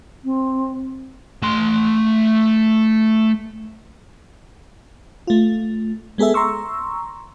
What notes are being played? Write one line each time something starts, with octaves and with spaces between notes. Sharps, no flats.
C4
A3 C6
A3 F4
G#3 B3 G#4 A4 E5
A#5 C6 C#6 E6